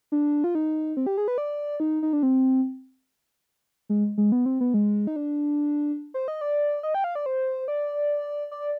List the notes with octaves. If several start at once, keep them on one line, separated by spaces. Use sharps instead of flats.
D4
F4
D#4
C4
G4
G#4
B4
D5
D#4
D#4
D4
C4
G#3
G#3
B3
C4
B3
G#3
D#4
D4
C5
D#5
D5
D#5
G5
F5
D5
C5
D5
D5